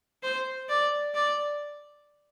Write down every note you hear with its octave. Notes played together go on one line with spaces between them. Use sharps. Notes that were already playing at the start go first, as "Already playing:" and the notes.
C5
D5
D5